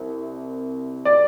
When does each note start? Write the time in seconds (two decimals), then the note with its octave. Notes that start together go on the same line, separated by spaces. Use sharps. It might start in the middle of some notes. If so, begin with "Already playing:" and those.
Already playing: C2 C3
1.05 D5